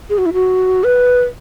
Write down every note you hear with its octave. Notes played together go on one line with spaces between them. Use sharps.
G#4
F#4
E4
F#4
B4